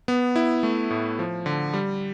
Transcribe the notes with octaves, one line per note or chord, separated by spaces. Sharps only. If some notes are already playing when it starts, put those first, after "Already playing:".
B3
E4
A3
A2
F3
D3
G3